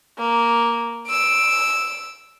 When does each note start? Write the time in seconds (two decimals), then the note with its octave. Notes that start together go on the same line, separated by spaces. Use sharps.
0.19 A#3
1.08 E6 D7